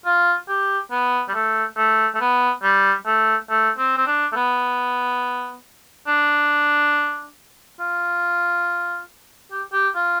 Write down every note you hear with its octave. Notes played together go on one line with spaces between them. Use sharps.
F4
G4
B3
G3
A3
A3
A3
B3
G3
A3
A3
C4
C4
D4
A3
B3
D4
F4
G4
G4
F4